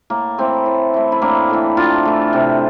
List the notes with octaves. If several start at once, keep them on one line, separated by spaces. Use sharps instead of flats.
A2 A#3
E3 A3 C4
A2
E3 A3
E4
A2 A#3 D4
E3 A3
A2 D4 F4
E3 A3
C3